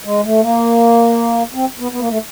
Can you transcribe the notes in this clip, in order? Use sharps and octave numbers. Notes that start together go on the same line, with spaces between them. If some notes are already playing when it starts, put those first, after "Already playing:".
G#3
A3
A#3
C4
B3
B3
A#3
A3